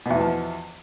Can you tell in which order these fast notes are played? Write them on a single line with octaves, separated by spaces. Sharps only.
B2 E2 E3 F3